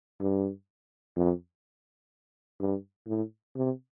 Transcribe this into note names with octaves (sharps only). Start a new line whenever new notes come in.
G2
F2
G2
A2
C3